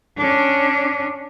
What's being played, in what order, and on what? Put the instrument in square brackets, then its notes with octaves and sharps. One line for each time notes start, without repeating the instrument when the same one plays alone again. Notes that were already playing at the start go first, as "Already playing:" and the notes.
[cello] C#4 D4